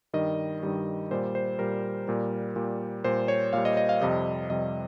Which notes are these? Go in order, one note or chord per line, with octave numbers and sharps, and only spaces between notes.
G2 D#3 G3 D#5
G2 D#3 G3
A#2 G3 C5
C5
A#2 G3 A#4
A#2 G3
A#2 G3
A#2 G3 C5
C#5
A#2 G3 F5
D#5
D#5
F5
F2 C3 G3 D#5
F2 C3 G3 D#5